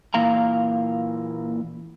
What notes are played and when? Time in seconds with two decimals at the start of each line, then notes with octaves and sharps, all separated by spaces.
0.14 A#2 E3 A#3 F5 A#5